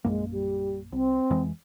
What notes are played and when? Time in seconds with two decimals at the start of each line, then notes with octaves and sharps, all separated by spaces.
0.05 A#1 F#2 G#3 A#3
0.32 G3
0.92 C2 C4
1.30 F2 E3 G#3